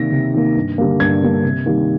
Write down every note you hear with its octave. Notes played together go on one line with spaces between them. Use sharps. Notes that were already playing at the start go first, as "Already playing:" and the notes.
Already playing: C3 D#3 A#3 A#6
C3
D#3 A#3
G2
D3 G3 A#3
G2 G#6
D3 G3 A#3
C3
D#3 G3 A#3